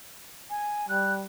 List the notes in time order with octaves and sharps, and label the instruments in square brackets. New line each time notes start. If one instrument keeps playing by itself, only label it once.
[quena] G#5
[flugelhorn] G3 [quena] F#6